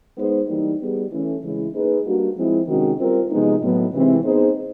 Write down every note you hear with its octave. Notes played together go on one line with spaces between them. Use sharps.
G#3 B3 D#4 G#4 C5
E3 G3 A#3 D#4
G3 B3 D#4 G#4
E3 A3 C#4
C#3 E3 G#3 C#4 E4
A#3 D#4 G#4 B4
G3 A#3 D4 F#4
F3 G#3 C4 E4
C3 D#3 G#3 C#4 F#4
G3 C4 F4 A#4
C3 F3 G#3 B3 D#4
A2 F#3 B3
C3 E3 G#3 C4 E4
B3 D#4 G#4 C5